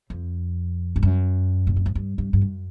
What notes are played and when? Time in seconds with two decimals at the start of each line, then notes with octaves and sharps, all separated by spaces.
0.10 F2
0.96 G2
1.03 F#2
1.67 A#2
1.76 A2
1.86 G#2
1.95 G2
2.18 G2
2.33 G2
2.41 F#2